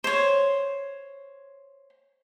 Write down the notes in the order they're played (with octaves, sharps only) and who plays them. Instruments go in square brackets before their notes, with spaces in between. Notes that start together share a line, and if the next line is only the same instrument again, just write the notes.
[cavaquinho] C5 C#5